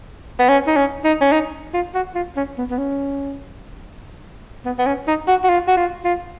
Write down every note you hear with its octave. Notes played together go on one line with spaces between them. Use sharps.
B3
C#4
D#4
C#4
D#4
C#4
D#4
F4
F#4
F4
C#4
B3
B3
C#4
B3
B3
C#4
D#4
F#4
F#4
F4
F#4
F4
F4